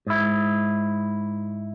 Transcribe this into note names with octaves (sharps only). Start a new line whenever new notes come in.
G#2 E4